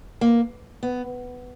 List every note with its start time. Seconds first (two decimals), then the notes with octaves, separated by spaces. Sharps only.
0.21 A#3
0.83 B3